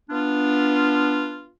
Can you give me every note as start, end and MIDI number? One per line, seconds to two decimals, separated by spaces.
0.10 1.49 59
0.10 1.49 62
0.10 1.49 65